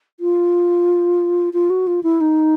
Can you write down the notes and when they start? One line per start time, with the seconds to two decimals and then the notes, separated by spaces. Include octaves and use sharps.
0.20 F4
1.53 F4
1.70 F#4
1.87 F4
2.03 E4
2.21 D#4